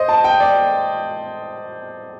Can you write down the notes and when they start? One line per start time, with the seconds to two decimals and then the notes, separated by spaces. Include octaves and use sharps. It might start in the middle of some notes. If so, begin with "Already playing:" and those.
Already playing: C5 D#5
0.08 A5
0.24 G5
0.40 D5